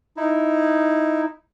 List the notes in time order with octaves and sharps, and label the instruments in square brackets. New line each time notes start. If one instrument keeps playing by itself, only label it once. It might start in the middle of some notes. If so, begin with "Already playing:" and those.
[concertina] D#4 E4